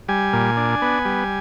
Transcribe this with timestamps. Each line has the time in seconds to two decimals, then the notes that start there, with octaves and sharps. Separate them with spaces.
0.08 G3 G#5
0.33 A#2
0.57 D4
0.82 B3
1.05 G3